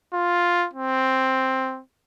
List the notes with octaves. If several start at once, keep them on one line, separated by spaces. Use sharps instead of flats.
F4
C4